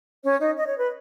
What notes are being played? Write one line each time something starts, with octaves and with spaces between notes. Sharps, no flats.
C#4 C#5
D#4 D#5
D#5
C#5
B4